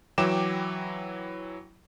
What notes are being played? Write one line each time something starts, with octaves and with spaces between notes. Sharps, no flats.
E3 F#3 E4 G5 D6 E7